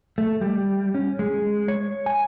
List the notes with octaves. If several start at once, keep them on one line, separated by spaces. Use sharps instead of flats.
A3
G3
C#4
G#3
C#5
G#5